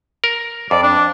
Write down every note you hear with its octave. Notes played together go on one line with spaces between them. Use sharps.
A#4
F2 D5
D4